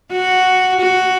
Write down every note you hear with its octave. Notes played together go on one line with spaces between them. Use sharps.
F#4
F#4